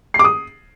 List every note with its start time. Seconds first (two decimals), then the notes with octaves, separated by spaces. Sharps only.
0.14 C7
0.19 D6
0.24 D#6